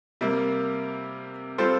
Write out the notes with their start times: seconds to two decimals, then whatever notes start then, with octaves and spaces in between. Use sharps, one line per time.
0.21 C3 G3 A#3
1.58 G3 C4 F4 A4 C5